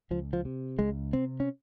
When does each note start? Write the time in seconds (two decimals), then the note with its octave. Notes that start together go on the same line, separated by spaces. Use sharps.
0.11 C#2 F3
0.33 F3
0.45 C3
0.79 C#2 G#3
1.13 C3 C4
1.40 C#4